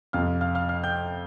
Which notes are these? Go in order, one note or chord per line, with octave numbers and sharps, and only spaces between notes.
F2 C3 F3 F5 F6
F5 F6
F5 F6
F5 F6
G5 G6